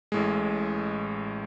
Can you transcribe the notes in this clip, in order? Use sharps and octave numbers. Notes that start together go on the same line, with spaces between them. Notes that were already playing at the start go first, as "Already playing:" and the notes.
A1 A2 G#3